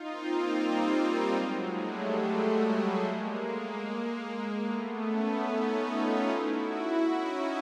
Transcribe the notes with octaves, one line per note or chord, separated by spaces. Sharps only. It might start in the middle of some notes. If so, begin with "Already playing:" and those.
Already playing: D#4 F4
A#3 C4
G3
G3
F#3 G#3
G3 A3
G#3 A#3
A3 B3
B3 C#4
C#4 D#4
D#4 F4
E4 F#4
C#4 D#4